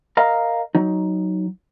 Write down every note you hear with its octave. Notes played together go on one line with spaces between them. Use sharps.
A#4 D#5 F5 A#5
F#3 D#4